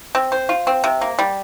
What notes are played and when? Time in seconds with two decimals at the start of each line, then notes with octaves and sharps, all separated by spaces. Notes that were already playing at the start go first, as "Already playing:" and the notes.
0.15 C4
0.32 C5
0.49 F4
0.67 C4
0.84 C3
1.01 A#3
1.19 G3